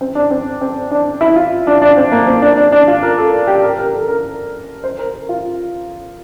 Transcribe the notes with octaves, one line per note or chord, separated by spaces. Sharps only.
C4
D4
C4
C4
D4
E4
F4
D4
D4
C4
A#3
C4
D4
D4
D4
F4
A#4
A4
G4
A#4
A#4
A4
A#4
C5
A#4
F4